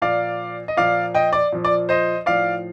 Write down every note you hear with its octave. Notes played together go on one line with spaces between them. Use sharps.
A#2 F3 D5 F5
D#5
A#2 F3 D5 F5
D#5 G5
D5
A#2 F3
D5
C5 D#5
A2 F3 D5 F5